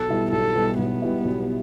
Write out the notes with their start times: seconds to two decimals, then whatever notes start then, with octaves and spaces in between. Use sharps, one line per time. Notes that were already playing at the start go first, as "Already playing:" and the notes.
Already playing: B1 A4
0.09 B2 G3 E4
0.31 B1 A4
0.55 B2 G3 E4
0.78 B1 B3
1.02 B2 G3 E4
1.25 B1